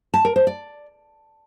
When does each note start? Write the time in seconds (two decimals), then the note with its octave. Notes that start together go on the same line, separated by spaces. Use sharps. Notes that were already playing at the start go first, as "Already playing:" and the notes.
0.14 A5
0.25 A#4
0.36 C5
0.47 D5